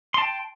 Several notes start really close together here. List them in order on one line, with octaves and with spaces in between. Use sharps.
C6 A5 G5